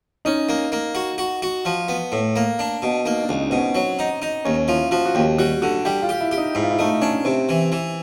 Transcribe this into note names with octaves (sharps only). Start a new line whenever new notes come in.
C#4 D#4
A#3
A#3
F#4
F#4
F#4
F3
B3
A2
A#3
D4
B2
A#3 D#4
D4
C#2
D#4
B2 C4
C#4
F#3
D#4
D#4
D#2 C#4
F3 E4
F3 F#4
F#4
D#2 G4
G3 F#4
D3 F#4
G3 G4
F4
G4
E4
G4
D#4
G#2 E4
F4
E4
A3 D#4
C#4 D4
C3 C4
E3
E3